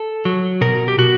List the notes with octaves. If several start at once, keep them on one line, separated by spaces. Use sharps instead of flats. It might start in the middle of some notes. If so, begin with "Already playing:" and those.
Already playing: A4
F#3
B2 A#4
G4
B2 F#4